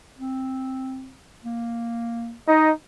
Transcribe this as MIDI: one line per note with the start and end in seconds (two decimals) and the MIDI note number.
0.18 1.11 60
1.43 2.34 58
2.48 2.71 63
2.48 2.71 75